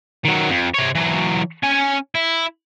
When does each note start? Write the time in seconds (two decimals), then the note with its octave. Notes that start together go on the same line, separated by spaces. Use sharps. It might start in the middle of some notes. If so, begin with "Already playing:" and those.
0.25 D#3 F#3
0.49 F2
0.74 C3 C#5
0.95 E3 F#3
1.64 C#4 G#5
2.15 E4